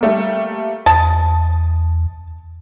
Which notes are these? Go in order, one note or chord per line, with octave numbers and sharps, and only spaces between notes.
G3 A3 A#3
E2 A5 D#6